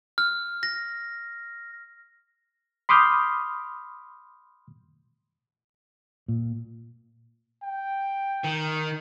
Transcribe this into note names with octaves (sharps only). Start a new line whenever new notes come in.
F6
A#6
B5 C6 D6 D#6 F6 G6
A#2
G5
D#3